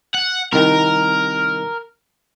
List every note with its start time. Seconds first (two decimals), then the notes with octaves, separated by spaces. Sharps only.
0.14 F#5
0.53 C2 D#3 A#4